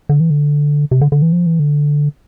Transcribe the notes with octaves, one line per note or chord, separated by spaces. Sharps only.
D3
E3
D3
C3
D3
D3
E3
F3
E3
D3